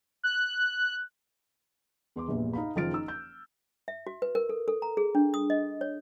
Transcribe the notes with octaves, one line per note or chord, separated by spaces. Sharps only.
F#6
E2 C6 D6
A#1 E2 G2 A#2
D#4 F5 B5
F#1 D#3 F3 F6 A6 D7
D#4 E6
G6
E5
F#4
B4
A#4
A4
A4
A#5
G#4
D4
D#6
D#5
C#5